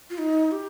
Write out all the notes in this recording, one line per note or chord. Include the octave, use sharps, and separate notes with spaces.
F4
D#4
G4